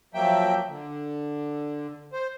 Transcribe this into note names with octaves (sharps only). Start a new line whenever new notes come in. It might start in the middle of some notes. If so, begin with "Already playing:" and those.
F3 F#3 A#3 E5 G5
D3
C5